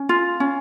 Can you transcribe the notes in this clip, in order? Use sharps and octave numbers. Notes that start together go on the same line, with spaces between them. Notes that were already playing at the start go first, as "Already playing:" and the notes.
Already playing: C#4
F4
C#4